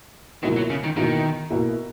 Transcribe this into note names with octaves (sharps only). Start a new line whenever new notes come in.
C#2 B2 D#3 A#3 E4
F#3
C#3
D#3
B2 D#3 A#3 E4
B2 A#3 E4